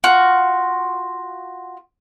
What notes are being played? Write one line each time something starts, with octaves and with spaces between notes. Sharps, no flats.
F4 F#4